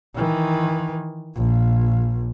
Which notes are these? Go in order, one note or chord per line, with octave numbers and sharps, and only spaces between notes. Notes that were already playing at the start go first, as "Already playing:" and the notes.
D#3 E3
A#1